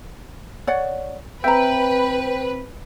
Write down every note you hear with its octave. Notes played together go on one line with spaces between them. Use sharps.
C#5 D5 F#5
C4 B4 E5 G5 A#5